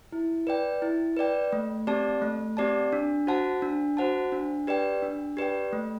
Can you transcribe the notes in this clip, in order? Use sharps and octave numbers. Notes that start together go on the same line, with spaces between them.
E4
B4 D5 G5
E4
B4 D5 G5
A3
C4 G4 D5 A5
A3
C4 G4 D5 A5
D4
F#4 C5 F#5 A5
D4
F#4 C5 F#5 A5
D4
G4 B4 D5 G5
D4
G4 B4 D5 G5
A3